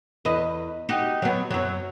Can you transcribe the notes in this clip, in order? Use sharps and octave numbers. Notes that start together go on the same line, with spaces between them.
E2 B4 D#5
D#4 F#4 G4
F#3 B3
F#2 F#3